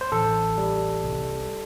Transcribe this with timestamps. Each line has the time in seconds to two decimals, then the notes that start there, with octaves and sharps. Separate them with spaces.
0.01 C5
0.12 A1 A4
0.58 G3
1.03 C2